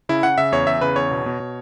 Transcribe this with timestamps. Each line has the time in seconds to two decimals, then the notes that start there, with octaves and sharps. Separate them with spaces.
0.09 C#3 E4
0.23 C#3 F#5
0.38 C#3 E5
0.52 E2 C#5
0.67 E2 E5
0.81 C#3 B4
0.96 E2 C#5
1.11 B2
1.26 B2
1.40 B2